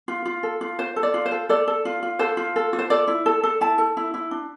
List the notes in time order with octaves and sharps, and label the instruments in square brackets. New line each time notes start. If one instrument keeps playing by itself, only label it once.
[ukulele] F4
F4
A4
F4
F4 C5
A4
D5
F4
C5
A4
A4 D5
A4
F4
F4
A4 C5
F4
A4
F4
C5
A4 D5
E4
A4
A4
E4 A5
A4
E4
E4
D4